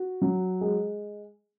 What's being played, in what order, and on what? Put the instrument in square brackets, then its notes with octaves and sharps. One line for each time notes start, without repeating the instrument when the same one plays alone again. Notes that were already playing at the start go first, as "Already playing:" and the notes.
Already playing: [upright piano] F#4
F#3
G#3